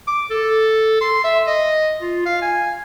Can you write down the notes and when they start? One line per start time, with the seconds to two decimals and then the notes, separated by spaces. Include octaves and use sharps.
0.07 D6
0.30 A4
1.01 C6
1.24 E5
1.47 D#5
2.01 F4
2.26 F5
2.42 G#5